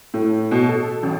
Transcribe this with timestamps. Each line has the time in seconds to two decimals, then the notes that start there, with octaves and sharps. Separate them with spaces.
0.14 A2
0.51 B2
0.69 A4
1.03 A1